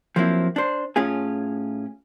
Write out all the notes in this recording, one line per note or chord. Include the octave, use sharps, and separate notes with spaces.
F3 F#3 A#3 C4 E4
D4 C5
A2 C#4 F4 G#4